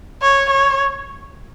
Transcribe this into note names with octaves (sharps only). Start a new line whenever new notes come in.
C#5
C#5